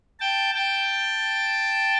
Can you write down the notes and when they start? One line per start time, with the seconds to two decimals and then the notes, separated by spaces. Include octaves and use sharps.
0.20 G5 A5
0.55 G5 A5